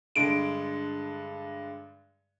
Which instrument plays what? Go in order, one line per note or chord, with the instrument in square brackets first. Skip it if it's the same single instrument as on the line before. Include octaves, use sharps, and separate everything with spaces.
[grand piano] G2 D3 G#3 [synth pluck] D7